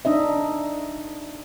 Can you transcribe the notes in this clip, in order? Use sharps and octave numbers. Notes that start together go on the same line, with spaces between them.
D4 D#4 D#5 E5